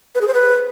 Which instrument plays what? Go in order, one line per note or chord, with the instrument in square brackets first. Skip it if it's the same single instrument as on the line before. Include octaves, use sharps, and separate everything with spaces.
[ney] B4
G#4
C5
B4